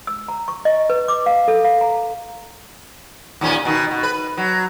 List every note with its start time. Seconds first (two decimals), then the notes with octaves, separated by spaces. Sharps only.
0.07 E6
0.28 A#5
0.48 C#6
0.65 D#5
0.90 B4
1.08 D6
1.26 F5
1.48 A4
1.65 F5
1.81 A#5
3.41 D#2 A#2 C#4
3.65 B2 D#3
3.91 B2
4.03 B4
4.37 F#3